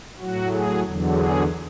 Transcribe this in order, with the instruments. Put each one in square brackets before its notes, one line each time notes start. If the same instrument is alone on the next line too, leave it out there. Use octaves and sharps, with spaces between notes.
[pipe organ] A2 F#3 F#4
G#4
E2 D3 F#3
G#4